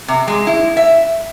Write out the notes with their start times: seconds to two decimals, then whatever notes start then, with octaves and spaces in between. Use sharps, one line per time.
0.08 C3
0.28 G#3
0.47 E4
0.77 E5